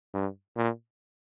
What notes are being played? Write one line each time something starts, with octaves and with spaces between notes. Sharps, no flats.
G2
A#2